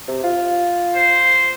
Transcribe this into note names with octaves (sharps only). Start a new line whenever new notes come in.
C3
F4
C5